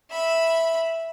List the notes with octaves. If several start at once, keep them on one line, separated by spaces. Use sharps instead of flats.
E5 B5